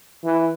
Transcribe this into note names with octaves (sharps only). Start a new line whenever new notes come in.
E3